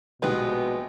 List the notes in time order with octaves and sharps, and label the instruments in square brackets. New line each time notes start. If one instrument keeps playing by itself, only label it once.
[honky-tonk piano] A#1 G4 [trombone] B2 [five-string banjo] G#3 B3